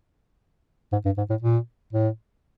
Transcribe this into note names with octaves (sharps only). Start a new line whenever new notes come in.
G#2
G2
G#2
A2
A#2
A2